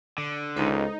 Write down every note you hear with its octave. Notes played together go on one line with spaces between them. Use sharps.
D3
C#2 G#3 D#4 A4 C5